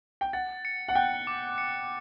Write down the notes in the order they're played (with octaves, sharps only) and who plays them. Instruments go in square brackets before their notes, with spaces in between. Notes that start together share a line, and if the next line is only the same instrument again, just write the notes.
[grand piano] G5
[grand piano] F#5 [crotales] A6
[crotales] C#7
[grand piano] F#5
[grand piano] G5 [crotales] F#6
[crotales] D6
C#7